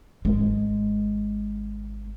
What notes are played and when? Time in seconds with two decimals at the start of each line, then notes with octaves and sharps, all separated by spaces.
0.25 G#1 G#3